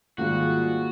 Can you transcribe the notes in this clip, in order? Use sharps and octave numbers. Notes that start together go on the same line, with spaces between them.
G#2 D#3 G3 A#3 F4 F#4 G#4